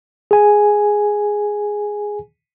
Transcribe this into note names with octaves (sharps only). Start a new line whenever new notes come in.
G#4 G#5